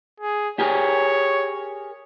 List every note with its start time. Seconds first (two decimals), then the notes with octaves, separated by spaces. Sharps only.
0.20 G#4
0.59 G4 G#4 A#4 C#5